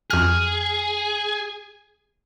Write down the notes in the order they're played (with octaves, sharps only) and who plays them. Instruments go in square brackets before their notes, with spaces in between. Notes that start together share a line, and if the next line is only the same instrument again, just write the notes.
[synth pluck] F2 F6 [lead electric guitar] G#4